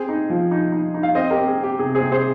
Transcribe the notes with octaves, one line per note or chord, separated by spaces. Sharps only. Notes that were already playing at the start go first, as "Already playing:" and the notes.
Already playing: C4 G#4 C5
D#4
F3
D#4
D#4
D#4
F5
C4 C5 D#5
G4 A#4
C4
G#4
C4
G4
C3 G#4
G#4 C5
C3
G#4 C5